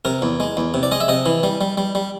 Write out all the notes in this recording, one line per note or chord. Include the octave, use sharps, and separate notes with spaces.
C3 A#4
E2
G#3
E2
C3
D5
G#3 D#5
E5
C3 D#5
E3
G3
G3
G3
G3